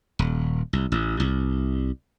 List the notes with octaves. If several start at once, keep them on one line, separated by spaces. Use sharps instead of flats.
D#1
C2
A1
C2